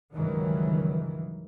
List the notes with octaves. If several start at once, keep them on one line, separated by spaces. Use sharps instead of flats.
C#2 G2 D#3 E3 F#3